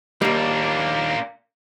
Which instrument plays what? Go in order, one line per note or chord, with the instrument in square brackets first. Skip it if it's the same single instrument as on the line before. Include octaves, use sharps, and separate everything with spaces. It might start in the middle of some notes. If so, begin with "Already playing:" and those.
[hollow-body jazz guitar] D#2 G3 [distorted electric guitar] A#3 D4